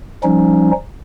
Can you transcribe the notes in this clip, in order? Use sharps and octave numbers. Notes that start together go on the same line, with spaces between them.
F3 G3 C#4 D#4